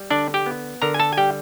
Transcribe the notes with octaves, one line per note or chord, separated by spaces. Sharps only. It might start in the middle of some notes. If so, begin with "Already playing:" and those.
Already playing: G3
D3 D4 D5
G4 G5
B3
D3 A#4 A#5
G#5
A4 A5
G#5
G3 G4 G5